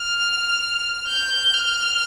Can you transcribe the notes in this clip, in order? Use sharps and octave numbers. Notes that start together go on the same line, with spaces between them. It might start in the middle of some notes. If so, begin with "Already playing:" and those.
Already playing: F6
G6
F6